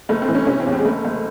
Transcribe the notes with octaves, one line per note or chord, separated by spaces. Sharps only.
F#1 A3
C4
E3
C#4
C3 C#4
C4
E2
C4
G#3
F#1 A3
F#1